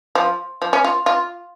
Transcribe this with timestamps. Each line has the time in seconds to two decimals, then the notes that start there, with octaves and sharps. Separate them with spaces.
0.15 F3
0.62 F3
0.73 C#4
0.84 F4
1.06 F4